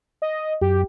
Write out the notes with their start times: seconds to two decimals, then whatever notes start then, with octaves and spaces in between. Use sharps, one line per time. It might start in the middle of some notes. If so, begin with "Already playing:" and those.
0.22 D#5
0.62 F#2 G4